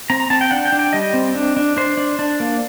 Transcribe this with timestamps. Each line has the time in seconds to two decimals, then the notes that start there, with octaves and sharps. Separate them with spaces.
0.10 C4 A#5
0.20 A#5
0.30 C4 A5
0.41 G5
0.51 D4 F#5
0.65 G5
0.72 D4
0.79 G5
0.93 G3 D#5
1.14 C4
1.35 D4
1.57 D4
1.77 D4 C5
1.97 D4
2.19 D4
2.40 A#3